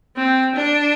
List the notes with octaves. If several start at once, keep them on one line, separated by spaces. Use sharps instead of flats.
C4
D4